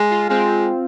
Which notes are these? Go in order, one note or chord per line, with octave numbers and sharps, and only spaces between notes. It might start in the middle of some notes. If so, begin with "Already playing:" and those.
Already playing: G#3
F4
G#3 C4